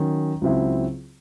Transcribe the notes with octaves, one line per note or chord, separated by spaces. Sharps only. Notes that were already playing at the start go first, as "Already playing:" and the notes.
Already playing: D#3 F#3 C#4
C#2 C#3 F#3 C4 E4